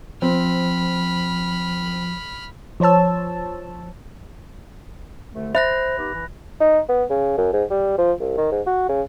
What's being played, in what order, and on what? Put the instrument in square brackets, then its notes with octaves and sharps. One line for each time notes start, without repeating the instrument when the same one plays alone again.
[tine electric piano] F3 [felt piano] C4 [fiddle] B5 F6
[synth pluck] F3 C5 C#5 A5 E6
[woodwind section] C2 D3 A3
[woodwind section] C5 [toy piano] E5 [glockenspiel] B5 F#6 A#6
[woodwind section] B3 D#4 G4
E3
[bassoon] D#4
B3
C#3
F#2
G#2
G3
F3
C2
D#3
G#2
F#4
C#3